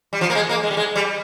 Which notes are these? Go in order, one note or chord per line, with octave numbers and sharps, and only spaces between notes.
G3
F3
A#3
G#3
A#3
G#3
G3
G#3
G3